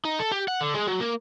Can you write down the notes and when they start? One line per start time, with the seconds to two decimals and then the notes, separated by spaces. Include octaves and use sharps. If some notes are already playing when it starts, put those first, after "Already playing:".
0.05 D#4
0.19 A4
0.32 G4
0.48 F#5
0.61 D3
0.74 G#3
0.87 F#3
1.00 A#3